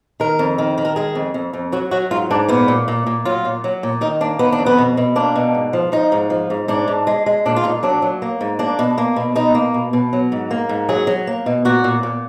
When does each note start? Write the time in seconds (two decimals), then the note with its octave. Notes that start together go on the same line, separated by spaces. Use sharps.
0.20 D#3 A#4
0.39 F2
0.58 D#3
0.78 D#3
0.85 A#4
0.96 G#3 G#4
1.15 F2
1.34 F2
1.53 F2
1.72 F#3 F#4
1.91 F#3 F#4
2.11 G#2 F4
2.30 G#2 D4
2.48 A#2 B3
2.68 A#2
2.88 A#2
3.07 A#2
3.25 F#3 F4
3.45 A#2
3.64 F#3
3.83 A#2
4.01 D#3 D#4
4.21 A#3 D4
4.39 D#3 B3
4.52 D4
4.59 F2
4.66 B3
4.78 B2
4.97 B2
5.16 A#3 D4
5.36 B2
5.55 G#2
5.73 F3
5.92 F3 D#4
6.12 G#2
6.30 F3
6.50 G#2
6.68 G#2 D4
6.88 G#2
7.07 G#3
7.26 G#3
7.46 A#2 D4
7.56 F4
7.64 A#2 D#4
7.83 F#3 D4
8.02 F#3
8.22 A#3
8.41 G#2
8.59 A#3 D4
8.79 B2
8.98 A#3
9.16 B2
9.35 B2 D#4
9.55 A#3
9.74 B2
9.93 B2
10.13 F#3
10.32 G#2
10.51 A#3
10.69 G#2
10.89 F#3 G#4
11.07 F#3
11.27 A#3
11.46 B2
11.65 A#2 F#4
11.84 A#2
12.03 A#2